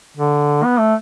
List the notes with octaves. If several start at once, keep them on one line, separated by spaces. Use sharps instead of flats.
D3
B3
A3